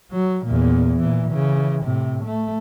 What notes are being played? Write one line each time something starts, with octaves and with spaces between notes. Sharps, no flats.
F#3
E2 A#2
A#2 E3
C#3 E3
A2 C3
A3